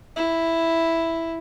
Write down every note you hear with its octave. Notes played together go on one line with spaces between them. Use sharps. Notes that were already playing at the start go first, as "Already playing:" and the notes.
E4